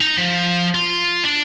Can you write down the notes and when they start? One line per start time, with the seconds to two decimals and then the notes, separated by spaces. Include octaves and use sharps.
0.01 D#4 A#5
0.18 F3
0.75 F4
1.25 D4